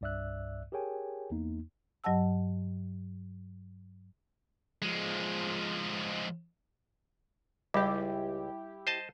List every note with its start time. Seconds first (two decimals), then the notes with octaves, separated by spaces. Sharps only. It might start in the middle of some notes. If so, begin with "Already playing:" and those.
0.01 C2 G2 D5 E5 E6 F#6
0.72 G4 G#4 A#4 C#5 G5 G#5
1.31 E2 A#3 D#4
2.04 G2 F#3 D#5 F#5 A5 E6
4.82 F3 G#3
7.74 C#2 G3 E4 G4
8.87 C5 D#5 A5